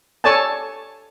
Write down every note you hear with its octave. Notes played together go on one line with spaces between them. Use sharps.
A4 C#5 D5 G#5 A5